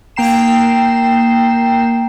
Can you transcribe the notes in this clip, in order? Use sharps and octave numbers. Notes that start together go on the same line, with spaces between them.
A#3 G5 A#5 C7 E7